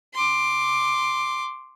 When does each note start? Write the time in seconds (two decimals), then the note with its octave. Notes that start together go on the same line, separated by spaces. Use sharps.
0.14 C6 D6